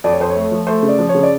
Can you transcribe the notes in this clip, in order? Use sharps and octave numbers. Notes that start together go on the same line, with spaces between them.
F2 D5
C#5
F2 C5
C#5
A3
F3
A3 C5
C#3
D5
F3
C#5
C#3
D5